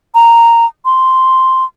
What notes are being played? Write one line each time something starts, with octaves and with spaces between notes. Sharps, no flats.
A#5
C6